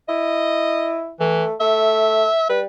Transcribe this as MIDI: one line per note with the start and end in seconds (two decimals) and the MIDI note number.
0.09 1.12 64
0.09 1.07 75
1.20 1.45 52
1.20 1.55 57
1.61 2.27 57
1.61 2.46 76
2.50 2.66 55
2.50 2.60 71